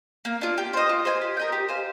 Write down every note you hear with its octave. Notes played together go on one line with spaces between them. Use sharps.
A#3
D4 F4
G4
C5 D#5
F4
C5 D#5 G#5
G4
A#4 D#5 G5
G4
C5 F5 G#5